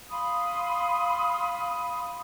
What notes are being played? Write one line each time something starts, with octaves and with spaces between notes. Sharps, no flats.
F5 B5 C6 D#6